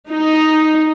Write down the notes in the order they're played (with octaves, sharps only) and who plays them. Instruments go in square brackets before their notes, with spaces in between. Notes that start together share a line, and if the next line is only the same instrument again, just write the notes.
[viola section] D#4